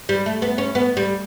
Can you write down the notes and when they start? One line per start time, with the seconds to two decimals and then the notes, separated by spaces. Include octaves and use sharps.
0.09 G3
0.26 A3
0.42 B3
0.58 C#4
0.75 B3
0.97 G3